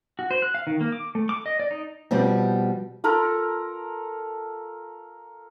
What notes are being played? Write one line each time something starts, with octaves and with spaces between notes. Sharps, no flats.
F#4
C5
F#6
F5
D#3
A#3
D6
A3
D6
D#5
D5
D#4
B2 F3 G3 B3 C4
F4 A4 A#4